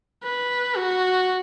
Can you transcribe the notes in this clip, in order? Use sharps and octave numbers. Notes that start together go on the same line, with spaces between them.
B4
F#4